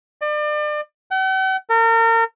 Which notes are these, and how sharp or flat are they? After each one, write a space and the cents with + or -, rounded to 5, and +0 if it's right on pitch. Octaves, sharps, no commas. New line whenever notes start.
D5 +35
F#5 +45
A#4 -35